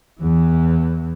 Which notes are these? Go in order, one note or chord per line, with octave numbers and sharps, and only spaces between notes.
E2 E3